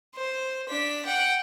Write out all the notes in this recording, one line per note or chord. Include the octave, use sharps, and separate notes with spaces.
C5
D4 B6
F#5 G5